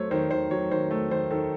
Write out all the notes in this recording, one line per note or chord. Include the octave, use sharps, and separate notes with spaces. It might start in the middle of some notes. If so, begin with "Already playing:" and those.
Already playing: F#3 A3 C5 C#5
D#3 C5
D#3 C5
F#3 C#5
D#3 C5
A3
D#3 C5
D#3 A4